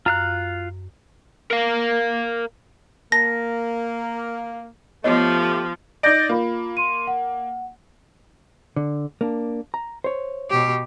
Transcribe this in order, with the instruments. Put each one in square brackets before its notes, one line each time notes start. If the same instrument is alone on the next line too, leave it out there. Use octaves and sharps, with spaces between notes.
[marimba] F#2 [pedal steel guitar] F4 F5 F#6
[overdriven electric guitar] A#4 F5
[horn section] A#3 [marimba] A5 [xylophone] A#6
[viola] F3 [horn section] A3 G4 [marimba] B3 C#5 D#5
[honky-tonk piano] D#4 D5 [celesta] G6 A#6 D7
[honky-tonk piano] A#3 [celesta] F4 B5
[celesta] C6 D#7
F#5
[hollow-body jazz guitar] D3
A#3 D4
A#5
C5 C#5
[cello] B2 G4